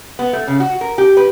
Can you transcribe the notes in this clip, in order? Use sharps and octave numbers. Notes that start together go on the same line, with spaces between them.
B3
A3
C#3
F#4
A#4
G4
B4